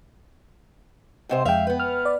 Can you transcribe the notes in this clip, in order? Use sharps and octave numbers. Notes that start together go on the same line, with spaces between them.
G#2 C3 C5
F2 G#3 E5 F5 G5
B3 B4
F6
D5